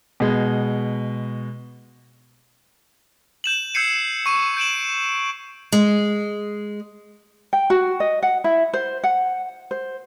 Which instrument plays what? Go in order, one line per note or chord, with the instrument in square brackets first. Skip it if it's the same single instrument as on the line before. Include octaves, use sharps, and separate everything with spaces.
[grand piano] B2 G#3
[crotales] G6 E7 F#7
E6 G6 G#6 C7 C#7 D#7
C#6 D#7
G6 D7 E7 F#7
[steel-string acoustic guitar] G#3
[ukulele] G5
F#4
D#5
F#5
E4
C5
F#5
C5